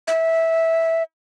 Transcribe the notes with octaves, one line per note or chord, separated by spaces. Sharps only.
E5